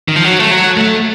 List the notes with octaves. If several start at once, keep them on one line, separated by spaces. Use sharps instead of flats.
D#3
F3
F#3
A3
F#3
A3